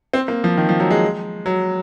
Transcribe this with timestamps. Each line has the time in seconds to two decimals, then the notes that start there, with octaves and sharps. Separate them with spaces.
0.14 C4
0.28 A#3
0.44 F3
0.57 D#3
0.69 F3
0.80 F#3
0.91 G#3
1.46 F#3